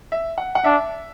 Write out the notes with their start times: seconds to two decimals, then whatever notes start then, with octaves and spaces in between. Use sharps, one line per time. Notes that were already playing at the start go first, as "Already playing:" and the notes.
0.12 E5
0.38 F#5
0.55 F#5
0.64 D4 E5